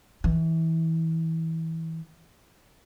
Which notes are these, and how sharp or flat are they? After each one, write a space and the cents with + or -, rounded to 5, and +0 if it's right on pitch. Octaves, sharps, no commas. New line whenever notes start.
E3 -25